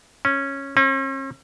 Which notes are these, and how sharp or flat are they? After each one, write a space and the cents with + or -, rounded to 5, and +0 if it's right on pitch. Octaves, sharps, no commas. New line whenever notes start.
C#4 -10
C#4 -45